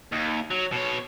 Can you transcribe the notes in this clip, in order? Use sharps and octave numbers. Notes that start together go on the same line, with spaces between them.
D#2
F#3
B2 C#5